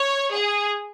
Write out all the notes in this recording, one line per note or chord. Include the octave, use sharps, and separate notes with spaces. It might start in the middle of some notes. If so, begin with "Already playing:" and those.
Already playing: C#5
G#4